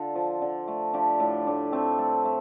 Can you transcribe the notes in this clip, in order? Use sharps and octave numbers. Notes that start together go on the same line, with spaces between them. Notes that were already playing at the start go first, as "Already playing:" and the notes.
Already playing: D3 F4 A4
F3
D3
A3
F3 D4 G4
A2 D4
A2 D4
A3 C4
A3
A3